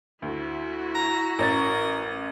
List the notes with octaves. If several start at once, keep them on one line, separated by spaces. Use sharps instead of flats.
D2 E4 F#4
A#5
A1 C#4 A#4 A6